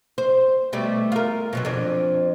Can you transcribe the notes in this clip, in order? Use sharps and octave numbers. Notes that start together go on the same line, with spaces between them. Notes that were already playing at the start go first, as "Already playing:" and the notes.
C5
B2 G3 A3
F4 A#4
B2 F3 F#3
F2 D4